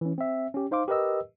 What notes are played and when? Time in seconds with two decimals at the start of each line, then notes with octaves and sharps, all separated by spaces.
0.01 E3 C#4
0.18 C4 E5
0.54 C#4 G4
0.71 D#4 C5 F5 C6 D6
0.88 G4 A#4 B4 D#5 E6